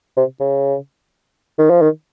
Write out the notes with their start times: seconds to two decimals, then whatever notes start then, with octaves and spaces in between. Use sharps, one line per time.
0.17 C3
0.40 C#3
1.58 D#3
1.70 F3
1.82 D#3